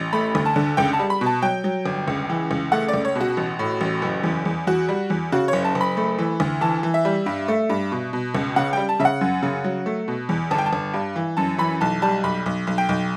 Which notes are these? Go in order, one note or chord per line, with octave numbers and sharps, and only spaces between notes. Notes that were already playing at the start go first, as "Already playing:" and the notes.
Already playing: A1
A3 B5
D2
A5
D3
C#2 G5
A5
G3
B5
B2
A5
F#3 G5
F#3
G1
C#2
E3
C#2
A3 F#5
D5
C#2
C#5
B2 F#4
A1
A2
A1
F#1
E2
E2
E2 F#4
G3
E2
C#3 F#4
C#5
F#1
A5
F#1
B5
A3
E3
D2
E3 A5
E3
E5
G3
G2
A3
G2
B2
B2
C#2
C#3 F#5
G3 G5
A5
C#3 E5
F#5
F#2
C#3
F#3
A3
B2
E2
G1 A5
G5
A5
G1
G2
E3
F#2 A5
E3 B5
B1 A5
G3 A5
B1 B5
B1
B1
G5
B1